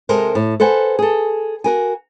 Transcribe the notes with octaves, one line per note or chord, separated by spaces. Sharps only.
C3 G#3 A4 A#4 C5
A2
A4 B4 C5 F#5 G#5
G#4 A4
F#4 A#4 G#5